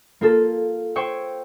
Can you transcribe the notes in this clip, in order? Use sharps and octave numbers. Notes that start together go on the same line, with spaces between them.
A#3 F4 A4
C5 C#5 G5 C#6 E6